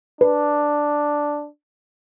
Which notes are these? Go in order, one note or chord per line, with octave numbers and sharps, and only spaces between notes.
D4 B4